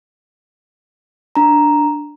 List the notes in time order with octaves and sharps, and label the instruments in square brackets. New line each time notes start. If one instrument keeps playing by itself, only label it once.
[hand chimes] D4 A#5